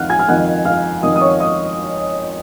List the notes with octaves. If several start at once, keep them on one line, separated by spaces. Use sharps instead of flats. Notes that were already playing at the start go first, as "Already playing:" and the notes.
Already playing: F2 D#3 F5 F#5 F6 F#6
G#5 G#6
F6
F2 D#3 F#5 F#6
F5 F6
F2 D#3 D#5 D#6
D#6
C#5 C#6
D#5 D#6